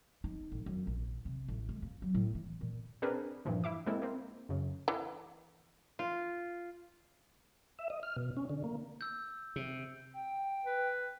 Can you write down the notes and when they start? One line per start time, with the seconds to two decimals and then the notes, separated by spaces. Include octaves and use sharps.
0.24 D#4
0.52 A1
0.66 F#2
0.87 A#1
1.25 C3
1.48 A1
1.69 G#3
1.82 A#3
2.02 F#3
2.14 A2
2.35 E3
2.61 A#2
3.02 C4 D4 G#4 A#4 B4
3.45 G2 A#2 E3 F3
3.64 E4 E5 D6
3.86 G#3 A#3 C4 E4 A4
4.02 A#3 C4
4.49 F#2 C#3
4.88 E3
5.99 F4
7.79 E5
7.90 D#5
8.03 F6
8.17 B2
8.37 C#4
8.49 D3
8.64 A#3
9.01 E6 G6
9.56 C3
10.14 G5
10.65 B4